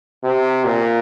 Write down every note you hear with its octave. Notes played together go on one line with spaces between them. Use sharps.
C3
A#2